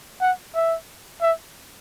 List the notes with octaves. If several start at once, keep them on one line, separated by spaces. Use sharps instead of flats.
F#5
E5
E5